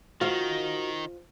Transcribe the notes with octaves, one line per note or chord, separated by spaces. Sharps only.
D#3 F4 F#4 C5